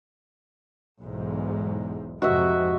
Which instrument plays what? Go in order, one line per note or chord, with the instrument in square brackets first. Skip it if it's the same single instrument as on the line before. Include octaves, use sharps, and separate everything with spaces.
[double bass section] B1 E2 G#2
[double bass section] F2 G#2 C3 [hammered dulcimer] F#4 D#5 E5